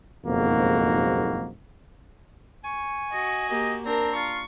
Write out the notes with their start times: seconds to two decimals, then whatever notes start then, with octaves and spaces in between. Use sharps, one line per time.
0.24 F#1 B1 F2 G#2 A#3 F#4
2.64 G#5 C#6
3.13 F#4 D#5
3.49 A#3 G4 D#5
3.85 C4 D4 A#4 A#5
4.15 F4 C#6